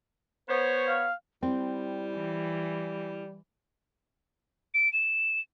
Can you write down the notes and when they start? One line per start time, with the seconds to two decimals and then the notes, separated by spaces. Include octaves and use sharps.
0.49 B3 C5 C#5
0.88 F5
1.43 G3 C4 E4
2.15 E3
4.74 D7
4.93 E7